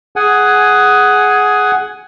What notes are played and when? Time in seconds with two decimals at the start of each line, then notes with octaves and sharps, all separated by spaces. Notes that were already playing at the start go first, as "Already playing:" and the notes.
0.16 G#4 F#5 G#5